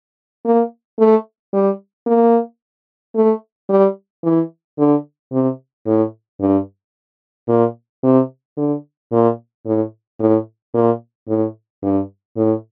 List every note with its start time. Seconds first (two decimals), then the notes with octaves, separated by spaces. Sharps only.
0.45 A#3
0.99 A3
1.53 G3
2.07 A#3
3.15 A3
3.70 G3
4.24 E3
4.78 D3
5.32 C3
5.86 A2
6.41 G2
7.48 A#2
8.03 C3
8.57 D3
9.12 A#2
9.66 A2
10.20 A2
10.74 A#2
11.28 A2
11.83 G2
12.37 A2